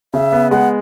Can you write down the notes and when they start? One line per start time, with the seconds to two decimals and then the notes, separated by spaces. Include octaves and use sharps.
0.14 C#3 E5
0.32 B3
0.51 G#3 F#5